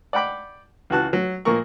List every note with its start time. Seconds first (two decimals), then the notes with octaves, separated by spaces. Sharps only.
0.13 D5 F#5 G5 B5 D6
0.90 C#2 E3 F#4 A5 F#6
1.13 F#3
1.45 A#2 F3 A#3 A#4 C#6